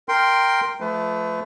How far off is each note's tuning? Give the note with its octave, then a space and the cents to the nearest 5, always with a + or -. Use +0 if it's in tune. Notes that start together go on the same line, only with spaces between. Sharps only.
A#4 +0 G5 +0 C6 +0
F3 +5 A3 -15 B4 +30